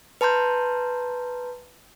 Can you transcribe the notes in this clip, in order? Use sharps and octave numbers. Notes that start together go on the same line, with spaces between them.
B4 A5 A#5 C6 G6